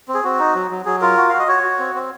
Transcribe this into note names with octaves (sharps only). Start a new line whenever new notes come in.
C4
G#4
C4 F#4
D#4
F#3
F#3
F#3 G#4
F4 A#4
F#4
F#4 F5
D#5
F#4 C#5
F#4
C4
C4